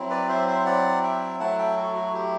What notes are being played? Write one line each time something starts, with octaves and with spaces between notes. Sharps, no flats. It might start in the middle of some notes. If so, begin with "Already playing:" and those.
Already playing: F#3 C4 E4
B4 D5
C5 E5
C5 E5
D5 F#5
E5 G5
F#3 A3 E4 F#5 A5
E5 G5
F#4 A4
F#4
G4